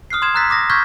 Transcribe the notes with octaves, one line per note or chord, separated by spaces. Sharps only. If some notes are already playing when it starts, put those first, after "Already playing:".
D#6 F6 F#6 C7
C6 D#6 G#6 E7
A#5 E6 F#6 A6 B6
D6 D#6 A#6
C#6 F6 G6 G#6 B6